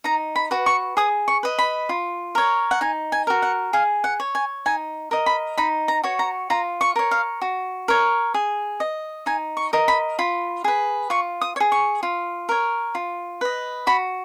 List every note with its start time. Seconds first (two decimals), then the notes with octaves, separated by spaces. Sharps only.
0.04 D#4 A#5
0.36 B5
0.51 F#4 B4
0.66 C#6
0.97 G#4 D#6
1.28 C#6
1.43 B4 D#5
1.58 B5
1.89 F4
2.35 A#4 C#5
2.71 F#5
2.81 D#4 G#5
3.12 G#5
3.27 F#4 A#4
3.42 F#5
3.73 G#4 F5
4.04 F#5
4.20 C#5
4.35 G#5
4.66 D#4 G#5
5.11 A#4 D#5
5.26 B5
5.57 D#4 B5
5.88 A#5
6.04 F#4 C#5
6.19 A#5
6.50 F4 A#5
6.81 C#6
6.96 A#4 C#5
7.11 F5
7.42 F#4
7.88 A#4 C#5
8.34 G#4
8.80 D#5
9.26 D#4 G#5
9.57 C#6
9.73 A#4 D#5
9.88 B5
10.19 F4 B5
10.64 G#4 B4
11.10 F4 C#6
11.41 D#6
11.56 C#5
11.60 G#4
11.72 C#6
12.03 F4
12.49 A#4 C#5
12.95 F4
13.41 B4 D#5
13.87 F#4 B5